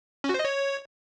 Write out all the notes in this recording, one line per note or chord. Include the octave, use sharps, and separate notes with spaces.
C#4
F#4
C5
D#5
C#5